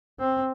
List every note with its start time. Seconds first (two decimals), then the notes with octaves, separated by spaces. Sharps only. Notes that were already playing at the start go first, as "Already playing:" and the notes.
0.20 C4